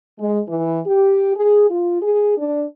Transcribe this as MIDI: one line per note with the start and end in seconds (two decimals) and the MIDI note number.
0.19 0.39 56
0.48 0.78 52
0.86 1.36 67
1.36 1.67 68
1.70 2.01 65
2.02 2.35 68
2.38 2.64 62